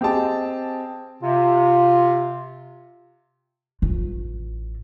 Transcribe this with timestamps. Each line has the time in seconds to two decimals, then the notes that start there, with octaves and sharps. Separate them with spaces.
0.01 C4 G4 G#4 D#5 A5
1.22 C3 F4
3.82 A1 F4